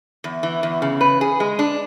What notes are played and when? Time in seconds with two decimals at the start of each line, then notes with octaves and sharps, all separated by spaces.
0.24 E2
0.43 E3
0.63 E2
0.82 C#3
1.01 B4
1.21 G#4
1.40 G#3
1.59 D4